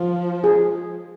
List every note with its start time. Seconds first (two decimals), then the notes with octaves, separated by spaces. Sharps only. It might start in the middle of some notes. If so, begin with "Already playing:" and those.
Already playing: F3
0.44 G#4